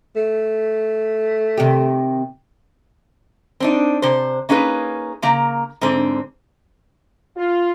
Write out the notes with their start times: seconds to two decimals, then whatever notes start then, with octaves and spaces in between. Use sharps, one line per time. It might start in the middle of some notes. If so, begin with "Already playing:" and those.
0.16 A3
1.57 C3 D#3 G4
3.60 C4 D4 D#4
4.02 C3 C5
4.49 A#3 C#4 D#4 G#4 B4
5.22 C#3 A#3 A#5
5.81 G#2 D3 C4
7.36 F4